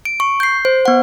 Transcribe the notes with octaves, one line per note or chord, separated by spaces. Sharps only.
D7
C#6
G6 C7
C5
B3 F#5